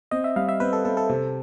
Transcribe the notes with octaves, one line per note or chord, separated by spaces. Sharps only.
C4 D#5
E5
G3 F5
E5
C4 B4
A4
C4 A4
A4
C3